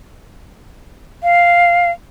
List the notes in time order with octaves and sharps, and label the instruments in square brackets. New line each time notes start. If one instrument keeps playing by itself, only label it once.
[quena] F5